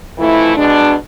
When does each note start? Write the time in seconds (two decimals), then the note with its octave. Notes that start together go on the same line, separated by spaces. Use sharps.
0.19 F2 E3 A3 E4
0.56 B2 G#3 D4